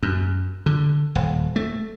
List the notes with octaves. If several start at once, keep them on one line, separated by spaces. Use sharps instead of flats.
F#2
D3
D#1
A3